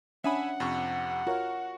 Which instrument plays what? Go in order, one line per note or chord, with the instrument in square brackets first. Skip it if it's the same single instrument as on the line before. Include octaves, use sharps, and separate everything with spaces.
[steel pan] C#4 D4 D#6 [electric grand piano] E5 G#5 B5 [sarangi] F#5
[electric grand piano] F2 C3 C#6
[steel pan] F4 A#4 C#5 [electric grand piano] F#4